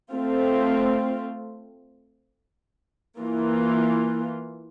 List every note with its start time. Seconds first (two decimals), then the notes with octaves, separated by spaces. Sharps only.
0.12 A3 C4 F4
3.18 E3 A#3 F4